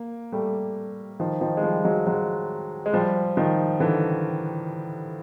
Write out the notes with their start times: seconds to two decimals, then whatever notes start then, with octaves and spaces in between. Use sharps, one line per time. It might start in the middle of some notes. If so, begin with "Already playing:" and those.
Already playing: A#3
0.32 G3 A3
1.20 D#3 F3
1.41 D#3 F3
1.57 G#3
1.63 F3 G3
1.84 F#3 G#3
2.06 F#3 G#3
2.86 G#3
2.94 F3 G3
3.37 D#3 F3
3.80 D3 E3